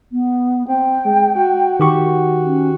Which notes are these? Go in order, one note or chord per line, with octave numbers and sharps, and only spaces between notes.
B3
C4 G5
G#3
F#4
D#3 G4 C#6
C#4